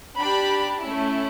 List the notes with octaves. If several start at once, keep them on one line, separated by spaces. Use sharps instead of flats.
D4 G4 B5
A3 C#4 E4